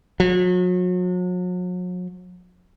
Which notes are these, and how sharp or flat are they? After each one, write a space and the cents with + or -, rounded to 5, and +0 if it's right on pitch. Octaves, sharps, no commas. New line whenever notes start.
F#3 -40